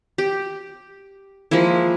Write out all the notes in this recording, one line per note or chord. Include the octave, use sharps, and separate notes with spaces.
G4
F3 G#3 A#3 E4